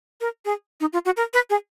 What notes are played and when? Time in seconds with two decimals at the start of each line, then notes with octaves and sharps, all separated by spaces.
0.21 A#4
0.45 G#4
0.81 D#4
0.93 F4
1.05 F#4
1.17 A#4
1.34 B4
1.50 G#4